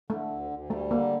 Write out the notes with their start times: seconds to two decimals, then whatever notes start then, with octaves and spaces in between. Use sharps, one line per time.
0.10 D3 A3
0.30 D2
0.51 D2
0.70 G3 A3
0.91 D3 A#3